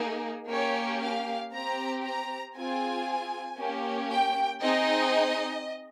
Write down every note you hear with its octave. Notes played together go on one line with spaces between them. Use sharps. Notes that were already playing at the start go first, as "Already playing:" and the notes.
Already playing: A#3 D#4 G#4
A#3 C#4 G4 C#5
F5
C4 G4 A#5
A#5
C4 F4 G#4 G#5
A#3 C#4 G4
G5
C4 D#4 G#4 D#5